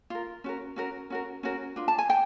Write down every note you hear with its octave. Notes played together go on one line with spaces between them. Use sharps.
F4 A#4
C#4 F#4 A#4
C#4 F#4 A#4
C#4 F#4 A#4
C#4 F#4 A#4
D4 F4
A5
G#5
G5